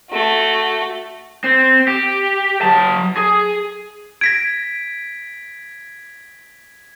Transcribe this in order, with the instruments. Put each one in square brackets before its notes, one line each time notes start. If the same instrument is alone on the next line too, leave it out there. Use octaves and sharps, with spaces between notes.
[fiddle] A3 F#4
[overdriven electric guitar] C4
G4
F#3 A5
G#4
[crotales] G#6 [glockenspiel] A#6 B6 D7